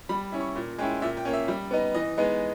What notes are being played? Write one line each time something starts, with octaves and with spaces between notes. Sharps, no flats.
G3 B5
C#4 E4
C#6
A#2
G#3 C#4 E4 G5
A#2 E5
G5
A#3 C#4
E5
G3
B3 D#4
E3 D#5
G#3 B3 D#4